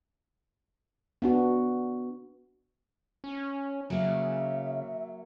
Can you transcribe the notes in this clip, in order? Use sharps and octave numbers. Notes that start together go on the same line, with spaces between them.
B3 D4 F#4
C#4
C#3 F#3 A#3 E5